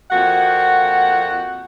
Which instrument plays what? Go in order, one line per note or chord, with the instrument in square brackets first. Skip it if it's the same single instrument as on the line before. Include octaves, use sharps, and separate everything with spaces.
[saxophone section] F2 A#3 F#4 F#5